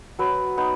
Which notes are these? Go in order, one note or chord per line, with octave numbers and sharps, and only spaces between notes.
F#3 B4
B3 D#4